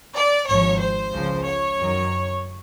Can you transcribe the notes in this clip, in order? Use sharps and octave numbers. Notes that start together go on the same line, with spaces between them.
D5
G#1 G#2 F3 C#5
C5
C#2 C#3 F3
C#5
F#2 D#3 F#3